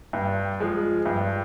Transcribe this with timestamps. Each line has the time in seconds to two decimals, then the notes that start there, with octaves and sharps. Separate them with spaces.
0.13 G2
0.60 F3 G#3
1.06 G2